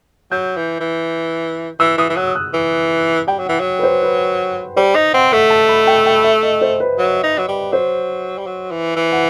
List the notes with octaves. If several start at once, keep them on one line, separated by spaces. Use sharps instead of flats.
F#3 G6
E3
E3
E3 E6
E3 D#6
E3
F#3 F#6
F#6
E3
G3 G5
F#3
F#5
E3
F#3
B4
C5
B4
G3 C5
D#4 D#5
C4 F#5
A3 F#5
A5
B5
G5
G5
E5
D#5
C5
B4
F#3
D#4
F#3
G3
F#3 C5
G3
F#3
E3
E3
F#5